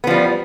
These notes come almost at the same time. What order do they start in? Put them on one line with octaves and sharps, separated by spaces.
B3 F3 G3